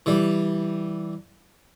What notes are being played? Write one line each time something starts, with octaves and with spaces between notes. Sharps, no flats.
E3 G3